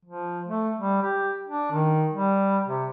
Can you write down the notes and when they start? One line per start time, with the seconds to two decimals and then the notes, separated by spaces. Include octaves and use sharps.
0.05 F3
0.46 A3
0.79 G3
1.03 G4
1.48 D4
1.72 D#3
2.13 G3
2.66 C3